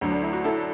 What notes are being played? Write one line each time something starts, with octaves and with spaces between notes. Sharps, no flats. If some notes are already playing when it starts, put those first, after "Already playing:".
D2 D3 F#3
D4
E4
F#4
E4 A4